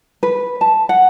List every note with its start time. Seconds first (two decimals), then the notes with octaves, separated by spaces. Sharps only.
0.23 B4
0.61 A5
0.89 F#5